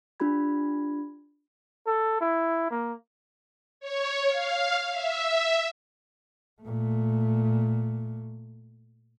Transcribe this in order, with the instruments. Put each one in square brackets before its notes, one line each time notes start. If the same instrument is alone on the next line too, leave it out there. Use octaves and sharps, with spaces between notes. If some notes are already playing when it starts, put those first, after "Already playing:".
[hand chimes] D4 F4 G4 B5 G#6
[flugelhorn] A4
E4
A#3
[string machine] C#5
F5
E5
[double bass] A#2 A3